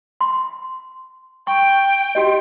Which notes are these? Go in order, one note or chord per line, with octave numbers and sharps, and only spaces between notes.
C6
G5 C#6
F#4 G4 D#5